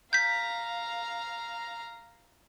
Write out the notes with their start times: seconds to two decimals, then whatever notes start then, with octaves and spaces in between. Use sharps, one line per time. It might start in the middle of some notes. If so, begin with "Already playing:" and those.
0.13 F5 A#5 G6 B6